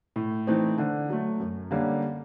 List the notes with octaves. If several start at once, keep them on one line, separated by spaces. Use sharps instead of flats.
A2
E3 A3 C4 D#4
D3
F#3 A3
F#2
D3 G3 A#3 C#4